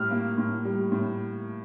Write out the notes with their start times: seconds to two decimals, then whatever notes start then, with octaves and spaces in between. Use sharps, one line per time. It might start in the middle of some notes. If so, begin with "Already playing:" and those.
Already playing: A2 G3 F6
0.11 A#3
0.38 A2
0.65 G3
0.92 A2